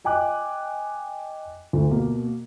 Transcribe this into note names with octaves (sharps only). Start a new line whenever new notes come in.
D#5 G5 G#5 D6 F#6
D2
B2 A#3